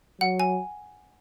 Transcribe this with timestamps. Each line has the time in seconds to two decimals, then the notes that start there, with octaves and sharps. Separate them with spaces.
0.21 F#3 F#5
0.40 G#5